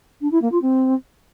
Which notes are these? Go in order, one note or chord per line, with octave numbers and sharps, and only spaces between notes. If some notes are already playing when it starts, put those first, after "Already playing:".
D4
E4
A#3
F4
C4